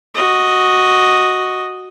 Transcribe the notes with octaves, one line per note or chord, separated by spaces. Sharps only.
F#4 D#5